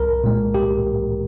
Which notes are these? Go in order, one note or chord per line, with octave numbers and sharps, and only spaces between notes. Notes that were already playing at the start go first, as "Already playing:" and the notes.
Already playing: C2 A#4
A#2 G#3
C2 G4